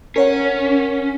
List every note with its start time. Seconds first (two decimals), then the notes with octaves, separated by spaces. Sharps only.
0.16 C#4 A#4 C#5 F#5